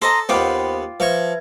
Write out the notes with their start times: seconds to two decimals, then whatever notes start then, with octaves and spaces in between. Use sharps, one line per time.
0.02 A4 C5 D#5 A#5
0.29 D#2 B3 F4 C5 G5 B5 D6
1.00 F3 B4 E5 C#6 G#6